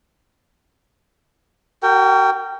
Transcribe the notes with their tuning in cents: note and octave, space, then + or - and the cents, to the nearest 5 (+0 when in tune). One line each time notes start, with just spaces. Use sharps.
F#4 +30 A#4 -30 G5 +0